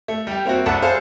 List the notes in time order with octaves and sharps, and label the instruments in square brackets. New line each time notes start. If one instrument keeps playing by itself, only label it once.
[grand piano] A3
G3 G4
A#3 C4 E4 F#4
C2 A4 E5 F#5 A5
G#4 A4 C5 F5